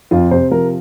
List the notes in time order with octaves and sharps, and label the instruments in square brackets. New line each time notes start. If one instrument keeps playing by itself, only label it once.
[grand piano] F2 F4
C3 C5
F3 A#4